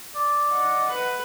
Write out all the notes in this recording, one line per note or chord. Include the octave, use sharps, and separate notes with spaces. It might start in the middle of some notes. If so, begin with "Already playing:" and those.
D5
D#5 F#5
B4